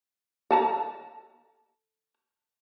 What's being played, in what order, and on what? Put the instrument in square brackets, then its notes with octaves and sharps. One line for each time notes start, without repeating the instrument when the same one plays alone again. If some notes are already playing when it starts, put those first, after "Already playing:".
[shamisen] A4 A5 A#5